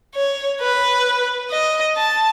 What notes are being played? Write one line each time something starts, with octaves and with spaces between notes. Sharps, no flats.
C#5
B4
D#5
A5